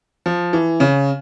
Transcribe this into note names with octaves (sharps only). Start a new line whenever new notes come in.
F3
E3
C#3